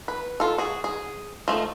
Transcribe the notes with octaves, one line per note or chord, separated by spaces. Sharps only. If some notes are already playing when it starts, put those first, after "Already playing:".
B4
F4 A4
F#4 G#4
G#4
F3 A3 D#4